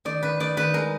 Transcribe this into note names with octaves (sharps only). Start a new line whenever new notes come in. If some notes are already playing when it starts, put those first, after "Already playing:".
D#3 D5
D#3 B4
D#3 D5
D#3 B4
G#3 A#4